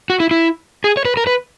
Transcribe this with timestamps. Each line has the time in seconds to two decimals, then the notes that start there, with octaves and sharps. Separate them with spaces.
0.10 F#4
0.20 E4
0.31 E4
0.84 G#4
0.97 C#5
1.05 B4
1.17 A#4
1.27 B4